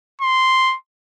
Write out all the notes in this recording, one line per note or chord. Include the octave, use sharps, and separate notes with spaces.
C6